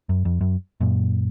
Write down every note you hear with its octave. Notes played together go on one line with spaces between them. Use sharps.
F#2
F2
F#2
F#2 A#2